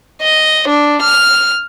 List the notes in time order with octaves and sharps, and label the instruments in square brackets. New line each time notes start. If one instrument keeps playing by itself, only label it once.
[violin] D#5
D4
F6